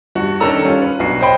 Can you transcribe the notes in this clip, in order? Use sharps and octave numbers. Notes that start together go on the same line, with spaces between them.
G2 F#4
D#3 C#4 D4 A4 A#5 E6
G3 C#4 F4
B4
B1 D4 F#4 C7
C5 C#5 D#5 G5 B5